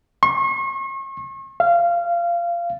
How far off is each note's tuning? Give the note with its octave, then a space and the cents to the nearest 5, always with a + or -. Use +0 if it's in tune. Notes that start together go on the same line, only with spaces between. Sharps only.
C#6 -40
F5 -20